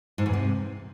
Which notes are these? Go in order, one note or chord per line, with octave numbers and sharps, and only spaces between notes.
G#2
E2
C3